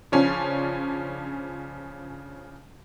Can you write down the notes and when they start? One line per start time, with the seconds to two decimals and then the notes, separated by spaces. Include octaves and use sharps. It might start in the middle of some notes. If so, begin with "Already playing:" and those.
0.12 C#3 F3 C#4 D4